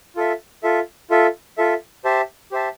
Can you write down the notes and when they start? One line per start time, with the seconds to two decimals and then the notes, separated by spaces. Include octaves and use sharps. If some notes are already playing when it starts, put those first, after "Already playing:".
0.16 F4 A4 E5
0.63 F4 A4 E5
1.11 F4 A4 E5
1.58 F4 A4 E5
2.04 G4 C5 E5 A5
2.52 G4 C5 E5 A5